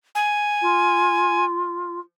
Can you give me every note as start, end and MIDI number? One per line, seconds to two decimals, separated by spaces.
0.15 1.45 80
0.62 2.00 65